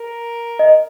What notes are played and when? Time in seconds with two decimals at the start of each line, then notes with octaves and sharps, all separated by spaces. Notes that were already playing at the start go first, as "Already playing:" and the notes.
Already playing: A#4
0.59 D#5